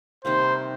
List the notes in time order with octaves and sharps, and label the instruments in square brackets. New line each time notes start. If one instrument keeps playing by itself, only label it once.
[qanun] C3 D#3 G3 A#3 [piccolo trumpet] C5